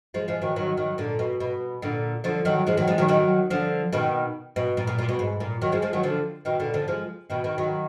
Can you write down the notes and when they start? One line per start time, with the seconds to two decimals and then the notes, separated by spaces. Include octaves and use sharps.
0.14 F3 G#3
0.28 F3 G#3
0.42 D#3 F#3
0.56 D#3 F#3
0.77 D#3 F#3
0.98 A#2 D3
1.19 B2
1.40 B2
1.82 A#2 D3
2.24 D3 F3
2.45 D#3 F#3
2.66 F3 G#3
2.77 D#3 F#3
2.87 F3 G#3
2.98 D#3 F#3
3.08 D#3 F#3
3.50 D3 F3
3.93 B2 D#3
4.56 B2
4.77 A#2
4.87 A#2
4.98 A#2
5.09 B2
5.19 G#2
5.40 A#2
5.61 D#3 F#3
5.72 F3 G#3
5.82 F3 G#3
5.93 D#3 F#3
6.03 D3 F3
6.45 B2 D#3
6.59 A#2 D3
6.74 D3 F3
6.88 F3 G#3
7.30 B2 D#3
7.44 B2 D#3
7.58 D#3 F#3